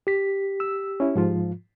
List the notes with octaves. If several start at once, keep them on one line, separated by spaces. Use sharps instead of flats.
G4 B6
E6
C#4 E4
G#2 F3 F4